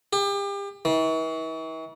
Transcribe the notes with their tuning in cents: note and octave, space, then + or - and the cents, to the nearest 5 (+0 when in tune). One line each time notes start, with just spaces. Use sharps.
G4 +35
E3 -45